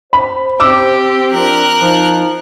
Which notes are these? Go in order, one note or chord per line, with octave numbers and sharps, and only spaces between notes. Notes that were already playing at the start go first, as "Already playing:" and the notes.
C5 B5
C4 G4 D6 E6
F3 D4 A#4 F#6
F3 C4 D#4